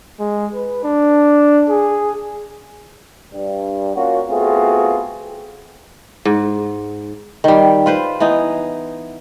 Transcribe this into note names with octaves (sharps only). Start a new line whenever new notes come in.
G#3
B4
D4
G#4
G2
A#3 C#4 F4 F#4
A3 B3 C4 F4 F#4 G#4
G#2
D#3 G3
F4 B4 C5
E3 B3 D#4